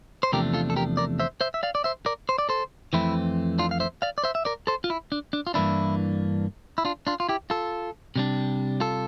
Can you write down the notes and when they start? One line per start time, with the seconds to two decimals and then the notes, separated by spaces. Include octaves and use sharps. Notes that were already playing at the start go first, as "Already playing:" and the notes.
0.23 C5
0.32 E2 C3 F3 A3 D4 G4 A#4
0.54 F4 A4
0.70 A4
0.76 G4 A#4
0.97 A#4 D5
1.20 C5 E5
1.41 C5 E5
1.54 E5
1.63 D5 F5
1.75 D5
1.84 C5 E5
2.06 A#4 D5
2.29 C5
2.38 D5
2.49 A4 C5
2.93 F2 E3 A3 C4 E4
3.58 D4 F4
3.71 F5
3.80 C5 E5
4.02 D5 F5
4.18 D5
4.24 C5 E5
4.35 E5
4.45 A#4 D5
4.67 A4 C5
4.84 F4
4.90 E4
5.12 D4
5.33 D4
5.47 F4
5.54 G2 E3 A#3 D4 E4
6.78 E4
6.85 D4 F4
7.07 D4 F4
7.20 F4
7.29 E4 G4
7.50 F4 A4
8.16 C3 G3 D4
8.80 F4 A4